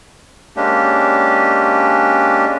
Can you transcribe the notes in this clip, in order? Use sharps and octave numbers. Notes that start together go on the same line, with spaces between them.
G#3 A#3 C#4 D4 G4